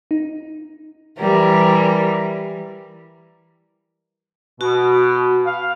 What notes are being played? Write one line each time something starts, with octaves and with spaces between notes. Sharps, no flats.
D#4
E3 G3 A#4
B2 F#4
F5